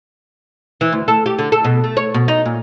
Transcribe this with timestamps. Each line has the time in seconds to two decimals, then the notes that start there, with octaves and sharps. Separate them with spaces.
0.81 E3
0.92 D2
1.08 A4
1.26 G4
1.39 D3
1.52 A4
1.64 B2
1.84 A3
1.97 C#5
2.14 B2
2.28 D#4
2.45 A#2